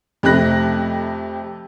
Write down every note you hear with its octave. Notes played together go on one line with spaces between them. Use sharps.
F2 C3 A3 B5 F#6 A#6